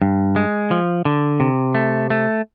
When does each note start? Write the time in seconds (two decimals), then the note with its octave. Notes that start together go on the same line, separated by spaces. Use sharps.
0.02 G2
0.36 G#3
0.71 F3
1.05 D3
1.40 C3
1.75 A3
2.10 A3